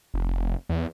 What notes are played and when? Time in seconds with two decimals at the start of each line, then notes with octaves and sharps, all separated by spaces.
0.14 F1
0.69 E2